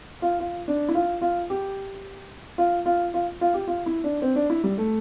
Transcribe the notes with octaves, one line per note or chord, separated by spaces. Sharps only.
F4
F4
D4
E4
F4
F4
G4
F4
F4
F4
F4
G4
F4
E4
D4
C4
D4
E4
G3
A3